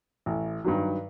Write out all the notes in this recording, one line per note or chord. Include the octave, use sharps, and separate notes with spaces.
A1
G2 D#3 F#3